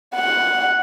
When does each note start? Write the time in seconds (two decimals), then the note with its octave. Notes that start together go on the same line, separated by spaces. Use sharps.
0.16 F#5